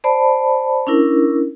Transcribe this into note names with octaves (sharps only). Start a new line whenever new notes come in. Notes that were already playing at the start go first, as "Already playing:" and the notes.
C5 D5 A5 B5
C#4 D4 E4 A#4